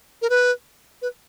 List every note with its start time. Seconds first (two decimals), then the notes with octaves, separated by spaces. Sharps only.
0.22 A#4
0.30 B4
1.02 B4